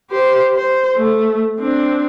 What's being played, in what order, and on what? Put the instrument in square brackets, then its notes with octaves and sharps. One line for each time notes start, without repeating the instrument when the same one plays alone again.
[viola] G4 C5
C5
A3
C4 D4